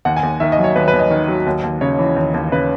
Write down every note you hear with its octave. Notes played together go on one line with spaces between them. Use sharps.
D#2 F#5
G#5
D#2
D#3 E5
D#5
F#3
C#5
D#2 B4
B4
D#2
D#5
D#3
F#3
D#2
D#2
C#3 C#5
E3
D#2
D#2
C#3 B4